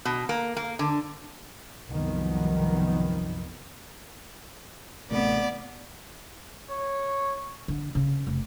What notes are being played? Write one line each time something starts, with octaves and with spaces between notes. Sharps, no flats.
B2
A#3
A#3
D3
C2 F#2 C3 D#3 F3 B3
A1 C3 A3 B3 D5
C#5
D3
C#3
F1